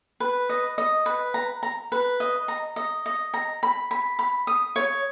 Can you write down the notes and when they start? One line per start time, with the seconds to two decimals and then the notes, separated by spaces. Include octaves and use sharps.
0.20 B4
0.49 D#5
0.78 D#5
1.06 B4
1.34 A#5
1.63 A#5
1.92 B4
2.20 D#5
2.48 A#5
2.76 D#5
3.06 D#5
3.34 A#5
3.63 B5
3.91 B5
4.19 B5
4.47 D#6
4.76 C#5